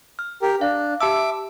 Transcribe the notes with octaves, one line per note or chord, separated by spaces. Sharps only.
F6
G4 A#4
D4 F5
G4 E5 A5 D6 E6